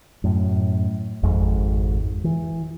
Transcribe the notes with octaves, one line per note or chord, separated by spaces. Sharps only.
F#2 A2
G#1 F2 G#2
E3